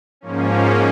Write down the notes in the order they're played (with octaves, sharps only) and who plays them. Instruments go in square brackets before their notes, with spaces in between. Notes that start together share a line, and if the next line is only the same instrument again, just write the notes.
[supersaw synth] G#2 F3 A#3 C#4